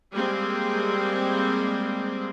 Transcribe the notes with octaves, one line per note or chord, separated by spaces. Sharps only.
G3 G#3 A#3 C4